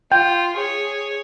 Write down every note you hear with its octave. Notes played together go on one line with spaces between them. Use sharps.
F4 G5
G#4 C#5